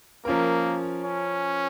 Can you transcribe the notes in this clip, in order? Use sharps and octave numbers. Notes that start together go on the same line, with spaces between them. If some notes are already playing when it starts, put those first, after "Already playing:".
F3 A#3 C#4 A#4
C#4